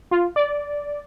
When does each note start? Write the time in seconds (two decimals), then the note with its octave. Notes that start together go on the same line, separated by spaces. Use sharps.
0.11 F4
0.36 D5